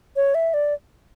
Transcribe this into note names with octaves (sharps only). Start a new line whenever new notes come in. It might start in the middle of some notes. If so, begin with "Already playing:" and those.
C#5
E5
D5